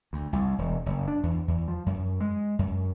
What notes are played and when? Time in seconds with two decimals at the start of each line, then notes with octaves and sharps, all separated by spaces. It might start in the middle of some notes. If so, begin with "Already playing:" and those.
0.13 D2
0.33 C2
0.58 E1
0.86 F#1
1.08 D4
1.23 E2
1.48 E2
1.68 F3
1.86 F#2
2.20 G#3
2.59 F#2